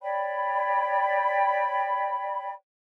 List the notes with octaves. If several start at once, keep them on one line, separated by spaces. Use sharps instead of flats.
C#5 D5 G5 B5